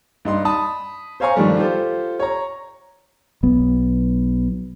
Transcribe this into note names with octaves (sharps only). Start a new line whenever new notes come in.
G2 D#4 C6
A5 B5 D#6
C5 C#5 F5 G#5 A#5 C#6
G2 D#3 F3 G3 A3
F4 G4 A4 C5
C#5 A#5
B1 F#3 B3